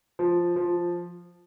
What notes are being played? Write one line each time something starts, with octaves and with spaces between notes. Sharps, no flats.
F3
F3